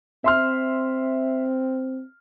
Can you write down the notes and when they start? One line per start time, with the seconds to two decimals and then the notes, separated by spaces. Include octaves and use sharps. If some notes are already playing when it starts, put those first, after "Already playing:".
0.24 C4 E5 C6 F6